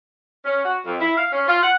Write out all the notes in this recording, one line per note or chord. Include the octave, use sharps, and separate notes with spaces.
C#4
F#4
F2
E4
F5
C#4
F4
F#5